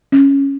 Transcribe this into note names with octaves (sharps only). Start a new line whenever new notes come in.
C#4